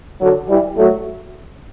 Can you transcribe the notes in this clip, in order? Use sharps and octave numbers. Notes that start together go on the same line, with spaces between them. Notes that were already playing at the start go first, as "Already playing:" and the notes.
D3 F#3
E3 G3
F#3 A3